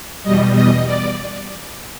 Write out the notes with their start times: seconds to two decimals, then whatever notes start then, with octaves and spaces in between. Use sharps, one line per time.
0.23 E2 B2 G3 D#5
0.55 D#5
0.85 D5